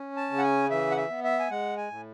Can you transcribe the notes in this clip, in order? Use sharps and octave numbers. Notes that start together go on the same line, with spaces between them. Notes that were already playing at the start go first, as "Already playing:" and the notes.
Already playing: C#4
A5
C#3
F#5
G#5
E3 E5
F#5
E5
B3
E5
G#5
G#3 F#5
G#5
A2